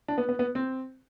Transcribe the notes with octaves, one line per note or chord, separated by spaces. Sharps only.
D4
B3
B3
B3
C4